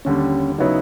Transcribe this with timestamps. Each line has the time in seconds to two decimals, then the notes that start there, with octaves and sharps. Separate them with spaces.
0.05 D#2 D3 G3 C#4
0.58 C#3 F#3 B3 D#4 E4